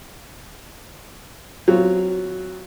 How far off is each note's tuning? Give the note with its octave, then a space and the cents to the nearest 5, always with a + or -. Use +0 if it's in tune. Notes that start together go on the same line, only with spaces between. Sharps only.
F#3 +0 C4 +0 F4 -15